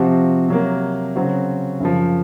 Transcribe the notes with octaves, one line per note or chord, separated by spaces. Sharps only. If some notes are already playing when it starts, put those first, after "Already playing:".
Already playing: C3 F3 C4 F#4
C3 F#3 A#3
C#3 F#3 C4 F#4
F#2 C#3 F3